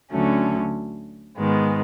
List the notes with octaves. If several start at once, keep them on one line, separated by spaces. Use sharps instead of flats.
D2 D3 F#3 A3 C#4
G#2 D#3 G#3 B3